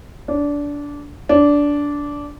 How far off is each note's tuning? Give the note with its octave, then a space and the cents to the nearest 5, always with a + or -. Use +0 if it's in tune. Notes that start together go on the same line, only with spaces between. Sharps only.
D4 -20
D4 -15